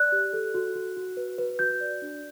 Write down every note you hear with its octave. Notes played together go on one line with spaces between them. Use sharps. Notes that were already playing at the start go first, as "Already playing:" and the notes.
Already playing: D5 F#6
G4
A4
F#4
F#4
F#4
B4
B4
F#4 G6
D5
D4